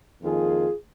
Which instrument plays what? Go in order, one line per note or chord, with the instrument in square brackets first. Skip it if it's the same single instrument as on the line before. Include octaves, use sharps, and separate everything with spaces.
[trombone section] F2 D#3 A#3 F4 G#4